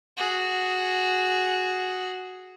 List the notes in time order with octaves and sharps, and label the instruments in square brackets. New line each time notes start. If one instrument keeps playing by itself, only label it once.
[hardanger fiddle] F#4 G#4